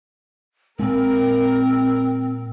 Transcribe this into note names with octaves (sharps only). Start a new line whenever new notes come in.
A#2 G#3 C4 A#4